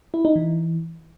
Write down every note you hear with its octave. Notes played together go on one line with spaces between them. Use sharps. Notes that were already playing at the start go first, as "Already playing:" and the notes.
E4
D#4
E3